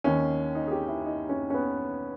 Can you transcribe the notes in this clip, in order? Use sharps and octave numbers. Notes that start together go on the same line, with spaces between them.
D#2 D#3 C#4
D#4
G#4
G4
E4
D#4
C#4
C#4
B3